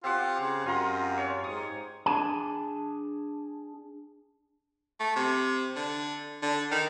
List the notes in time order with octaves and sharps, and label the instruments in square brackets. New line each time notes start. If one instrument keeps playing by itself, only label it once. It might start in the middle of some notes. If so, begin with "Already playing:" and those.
[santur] C4 G4 F#5 [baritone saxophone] F4
[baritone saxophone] C#3
[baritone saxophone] F#2 [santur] F4 A#5 C6
[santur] C#5
[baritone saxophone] G#2 [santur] D#6
[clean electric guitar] D4 G#4 G#5 A5
[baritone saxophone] A3
C3
D3
D3
D#3